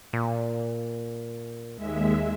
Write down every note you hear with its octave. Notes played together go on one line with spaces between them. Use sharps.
A#2
D#2 G#3 E5